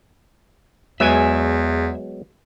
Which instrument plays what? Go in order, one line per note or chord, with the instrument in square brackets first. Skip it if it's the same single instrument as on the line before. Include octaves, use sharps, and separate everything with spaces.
[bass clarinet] E2 [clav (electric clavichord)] F#3 G#3 B3 [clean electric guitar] E5 G#5